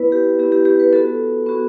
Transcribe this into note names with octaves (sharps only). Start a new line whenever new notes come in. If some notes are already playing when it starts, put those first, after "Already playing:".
Already playing: B3 E4 B4
G4
B3 E4 G4
G4
G4
B4
B3 F#4 A4
B3 F#4